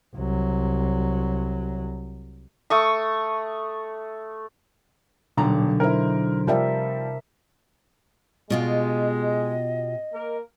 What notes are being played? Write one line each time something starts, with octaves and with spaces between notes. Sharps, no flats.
C2 F#3
A3 C#6 D#6
D#1 B1 D3 A#5
D#4 E4 A#4 C5
C3 F3 G3 A#4 E5
B2 G#3 F4 G4 D#5
A#3 A#4